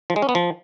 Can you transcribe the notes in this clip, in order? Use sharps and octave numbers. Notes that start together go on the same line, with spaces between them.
F3
G#3
C#4
B3
F3